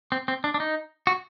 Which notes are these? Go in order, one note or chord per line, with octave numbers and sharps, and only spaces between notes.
C4
C4
D4
D4
D#4
F#4